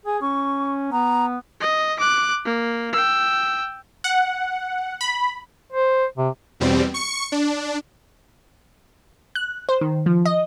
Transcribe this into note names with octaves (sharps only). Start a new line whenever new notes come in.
G#4 G#5
C#4 C#6
B3 A#5
D#5
D6 F#6
A#3
G5 E6
F#5
B5
C5
C3
E2 B2 G3 C4
C#6 C#7
D4
F#6
C5
D#3
F3
D#5